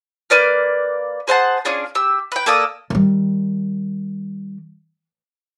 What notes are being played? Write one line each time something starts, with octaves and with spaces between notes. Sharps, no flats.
A#3 B4 D5 F6
G#4 C5 F#5 A5
C#4 D4 F4 G#4
G4 E6
B4 G5
A#3 A4 D5 D#6
D#3 G3